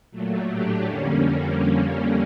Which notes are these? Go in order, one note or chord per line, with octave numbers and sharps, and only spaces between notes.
A#2 F#3 A3
A2 F#3 A3 D4 G4
F2 D3 G3 A#3 C#4